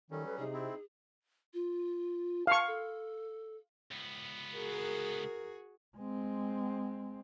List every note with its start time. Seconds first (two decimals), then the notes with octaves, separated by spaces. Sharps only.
0.11 D#3 F#3 G3 C#4 A4
0.26 A4 B4
0.39 C3 D#4 G#4
0.53 C4 E4
1.54 F4
2.47 F5 A5 C#6
2.67 A4
3.91 C#2 B3
4.54 F#4 G#4 A#4
5.97 G#3 C4